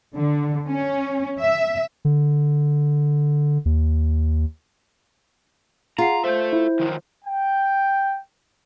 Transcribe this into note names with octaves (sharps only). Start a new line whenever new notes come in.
D3
C#4
E5
D3
D#2
F4 G#4 F#5 A#5 C7
A4 C5 E5 G6
E4
D#3 F3 F#3
G5